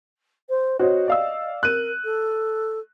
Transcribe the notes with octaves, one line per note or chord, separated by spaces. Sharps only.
C5
F#4 C5 C#5 D#5
D5 F5 E6
A#4 F#6 D#7
A4